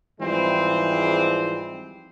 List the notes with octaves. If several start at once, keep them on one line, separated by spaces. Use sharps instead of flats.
G#2 E3 F3 G3 G#3 C4